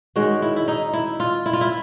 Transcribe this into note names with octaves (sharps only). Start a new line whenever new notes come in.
D#3 G#3 C#4 F#4
E4
E4
D#4
E4
F4
E4
F4
E4